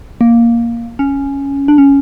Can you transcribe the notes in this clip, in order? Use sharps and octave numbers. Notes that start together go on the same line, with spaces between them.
A#3
C#4
D4
C#4